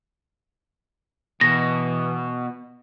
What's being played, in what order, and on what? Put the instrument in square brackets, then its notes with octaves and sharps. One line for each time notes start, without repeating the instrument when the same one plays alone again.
[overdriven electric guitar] B2 [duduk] E3 [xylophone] A#6